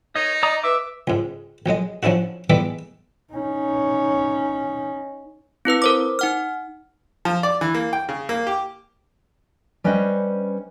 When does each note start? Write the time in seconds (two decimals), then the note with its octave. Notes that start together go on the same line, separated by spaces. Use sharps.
0.15 D#4 A#4 C#5 D#5
0.43 D5 D#5 A#5 D#6
0.64 B4 E5 D6
1.07 C#2 G#2
1.66 A#1 F#3 G#3 D#5
2.03 F3 C#4 D4 E4 F#4
2.50 E3 G3 G#3 B3 E5 D6
3.33 C#4 D#4
5.65 C4 E4 B4 E6
5.82 A#4 C5 D6
6.19 D#4 F#5 F6
7.25 F3
7.43 D5
7.61 E3
7.74 A#3
7.93 G5
8.09 C#3
8.29 A#3
8.47 G4
9.84 G3 C#4 B4 C5 D#5